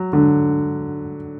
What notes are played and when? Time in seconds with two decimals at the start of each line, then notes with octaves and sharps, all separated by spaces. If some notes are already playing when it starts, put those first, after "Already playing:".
Already playing: F#3
0.13 D3